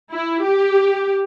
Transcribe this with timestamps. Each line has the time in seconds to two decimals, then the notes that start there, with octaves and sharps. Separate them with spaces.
0.12 E4
0.44 G4